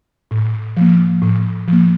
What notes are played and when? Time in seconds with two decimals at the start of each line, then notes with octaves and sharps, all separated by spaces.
0.31 A2
0.77 F3 A#3
1.22 A2
1.68 F3 A#3